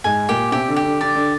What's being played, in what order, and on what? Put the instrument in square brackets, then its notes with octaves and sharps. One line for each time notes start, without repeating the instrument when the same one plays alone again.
[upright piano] G#2 G#3 [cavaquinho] G#5
[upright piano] A#2 A#3 [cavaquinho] G4
[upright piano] C3 C4 [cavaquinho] G4
[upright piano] D3 D4
[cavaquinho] G4
[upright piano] D3 D4
[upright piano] D3 D4 [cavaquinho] D5
[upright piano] D3 D4